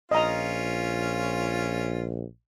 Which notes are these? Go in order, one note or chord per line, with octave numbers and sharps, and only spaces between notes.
A#1 C#4 F4 D#5 A#5